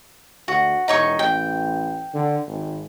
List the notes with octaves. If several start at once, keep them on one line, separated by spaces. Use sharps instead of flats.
D2 F#4
E1 D#4 C#5 C#6
A1 G5
D3
G#1